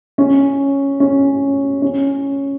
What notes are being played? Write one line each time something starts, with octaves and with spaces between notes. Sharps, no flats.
C#4
C#4
C#4